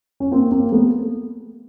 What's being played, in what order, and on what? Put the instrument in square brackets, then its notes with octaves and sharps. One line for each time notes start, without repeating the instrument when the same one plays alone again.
[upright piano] C#4
A#3 C4
A#3 C4
A3 B3